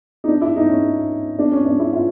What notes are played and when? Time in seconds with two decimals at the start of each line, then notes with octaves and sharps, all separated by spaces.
0.24 D#4
0.28 D4
0.41 E4
0.56 D#4
0.69 C#4
1.39 D4
1.52 C#4
1.65 D4
1.80 E4
1.93 F4